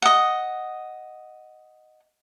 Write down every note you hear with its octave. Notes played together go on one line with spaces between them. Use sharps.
D#5 F#5